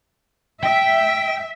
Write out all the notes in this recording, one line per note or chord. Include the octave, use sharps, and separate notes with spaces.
E5 G5